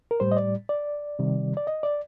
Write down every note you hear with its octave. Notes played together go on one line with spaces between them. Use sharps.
A#4
A2 G3 C5
D#5
D5
D5
C3 D#3 G3
D5
D#5
D5